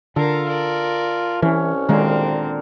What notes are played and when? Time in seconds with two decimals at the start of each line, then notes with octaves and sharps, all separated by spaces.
0.16 D3 F4 A4 A#4 F5
0.48 A#4 D5
1.42 C2 E3 C#4
1.89 A#2 D3 D#3 G#3 C4 A#4